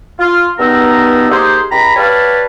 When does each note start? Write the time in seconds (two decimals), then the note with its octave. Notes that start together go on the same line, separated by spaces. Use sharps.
0.19 F4
0.59 C#2 G2 B3 D#4 A#4 E6
1.30 A#3 D#4 G4 G#4 C5
1.71 C#2 G4 A#5 B5
1.96 G4 B4 C#5 D5 F5 A5